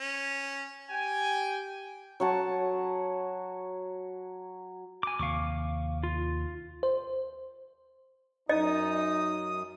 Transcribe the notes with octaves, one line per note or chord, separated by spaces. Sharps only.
C#4
G4 G5 G#5
F#3 C#5 F#5 A5
G#5 D6
D#2 C3 F5 C#6 D6
F4
C5
F#2 D#4 D#5 D#6